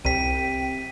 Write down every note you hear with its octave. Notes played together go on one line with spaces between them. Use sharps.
C2 C3 G5 B6 D#7